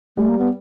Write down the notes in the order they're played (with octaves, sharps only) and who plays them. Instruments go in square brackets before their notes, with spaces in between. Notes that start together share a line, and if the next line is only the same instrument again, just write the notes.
[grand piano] G3 [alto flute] A3
[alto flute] A#3
B3